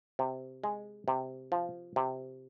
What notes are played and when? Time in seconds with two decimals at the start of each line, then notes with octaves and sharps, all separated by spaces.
0.19 C3
0.64 G#3
1.08 C3
1.52 F3
1.96 C3